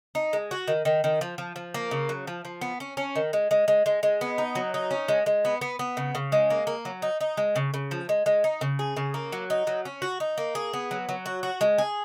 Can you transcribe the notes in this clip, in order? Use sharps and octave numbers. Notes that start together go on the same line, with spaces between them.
D#4
G#3
F#4
D#3
D#3
D#3
F3
F3
F3
A#3
C#3
F#3
F3
F3
B3
C#4
C#4
D#3
G#3
G#3
G#3
G#3
G#3
B3
D#4
F#3
D#4
C#4
G#3
G#3
B3
B3
B3
C#3
C#3
G#3
A#3
A#3
F#3
D#4
D#4
G#3
C#3
C#3
F3
G#3
G#3
D#4
C#3
G#4
C#3
A#3
F#3
D#4
F#3
C#4
F#4
D#4
A#3
G#4
B3
F#3
F#3
F#4
F#4
G#3
G#4